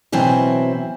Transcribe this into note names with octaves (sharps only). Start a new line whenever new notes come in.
B2 E3 F#3 C4 E4